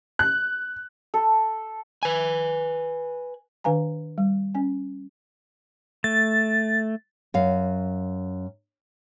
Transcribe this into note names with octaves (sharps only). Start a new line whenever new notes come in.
F#6
A4
B4 G#5
D#3 D4 B4 F5 G#5 A#5
G3
C#4 G#5
A3 A6
F#2 F5